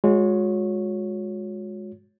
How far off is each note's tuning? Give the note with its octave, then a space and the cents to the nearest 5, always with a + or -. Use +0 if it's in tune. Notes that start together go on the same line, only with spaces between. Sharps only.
G#3 +0 F#4 -40 C#5 +0